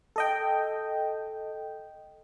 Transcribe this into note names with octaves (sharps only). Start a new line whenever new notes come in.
A4 D#5 G5